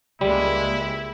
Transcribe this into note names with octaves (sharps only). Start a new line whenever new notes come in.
C#2 G3 G#3 A#3 E4 B5